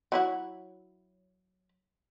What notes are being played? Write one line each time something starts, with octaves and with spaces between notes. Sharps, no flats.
F#3 E4 F#4